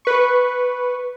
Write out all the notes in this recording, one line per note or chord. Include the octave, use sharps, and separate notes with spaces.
B4 C#6